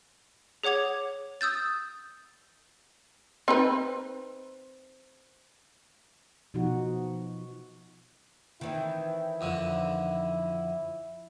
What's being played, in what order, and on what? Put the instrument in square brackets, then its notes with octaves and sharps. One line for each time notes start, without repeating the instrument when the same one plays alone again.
[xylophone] G#4 C#5 F#5 D6 G#6
D#6 E6 G6 A6
[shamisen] C4 D#4 B4
[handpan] B2 F3 D#4 F#4
[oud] D#3 E3 C4 [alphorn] E4
[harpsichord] F2 D3